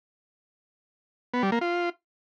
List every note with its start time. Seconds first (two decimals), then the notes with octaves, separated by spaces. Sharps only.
1.34 B3
1.43 G3
1.52 A#3
1.61 F4